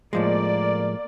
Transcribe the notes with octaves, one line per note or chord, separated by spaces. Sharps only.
A2 F3 G#3 A#3 D5